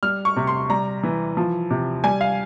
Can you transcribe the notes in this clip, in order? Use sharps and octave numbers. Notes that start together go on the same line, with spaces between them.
G3 F6
C#6
C3
C6
G3 A#5
E3
F3
C3
G3 G#5
F5